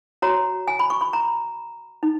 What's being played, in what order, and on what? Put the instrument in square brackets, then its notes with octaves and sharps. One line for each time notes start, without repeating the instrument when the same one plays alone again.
[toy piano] F#4 C#5 A#5
G#5
B5
C#6
B5
A#5
D#4